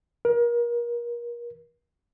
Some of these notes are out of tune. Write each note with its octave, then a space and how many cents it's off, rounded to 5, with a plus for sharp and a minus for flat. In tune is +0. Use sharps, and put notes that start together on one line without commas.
A#4 +30